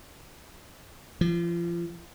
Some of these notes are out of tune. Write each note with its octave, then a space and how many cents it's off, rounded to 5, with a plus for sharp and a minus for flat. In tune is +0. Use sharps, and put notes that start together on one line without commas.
F3 -35